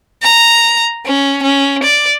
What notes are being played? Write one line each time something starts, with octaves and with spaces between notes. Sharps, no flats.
A#5
C#4
C#4
D5